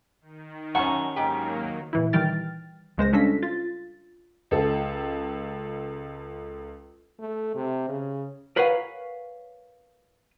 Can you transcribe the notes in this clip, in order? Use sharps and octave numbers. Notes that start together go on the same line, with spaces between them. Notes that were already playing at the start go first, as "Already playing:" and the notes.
D#3
F#2 C#4 F#4 F#5 A5 C#6
G#2 D#3 F#3 A#3 G4
A#2 E3 E4
D#3 E3 G3 G5 F6 A6
C#2 G#3 C5 A#6
G3 C#4 D4 F4 A4 B6
F4 A6
C#2 A4
A3
C3
C#3
A#4 B4 C#5 F5 F#5 G#5